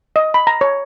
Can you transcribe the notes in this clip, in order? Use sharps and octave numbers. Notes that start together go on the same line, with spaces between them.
D#5
B5
A#5
C#5